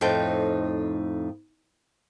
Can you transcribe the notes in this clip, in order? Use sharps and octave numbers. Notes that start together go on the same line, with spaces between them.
F2 A2 D#4 C5 G5 A5